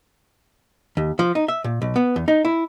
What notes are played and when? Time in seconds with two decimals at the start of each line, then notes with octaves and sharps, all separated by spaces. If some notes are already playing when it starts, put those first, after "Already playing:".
0.97 D#2
1.19 F3
1.35 D#4
1.48 E5
1.64 A#2
1.82 B1
1.96 B3
2.16 E2
2.28 D#4
2.45 E4